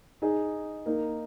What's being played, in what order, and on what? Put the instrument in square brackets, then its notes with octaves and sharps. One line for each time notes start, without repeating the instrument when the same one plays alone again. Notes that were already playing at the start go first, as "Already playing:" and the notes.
[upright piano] D#4 G#4
A#3 D#4